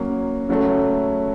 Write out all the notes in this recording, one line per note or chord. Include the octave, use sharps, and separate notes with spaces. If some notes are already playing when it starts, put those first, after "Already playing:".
Already playing: F#3 A#3 C#4
C#3 F#3 A3